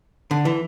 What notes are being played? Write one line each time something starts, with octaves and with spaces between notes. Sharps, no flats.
D3
E3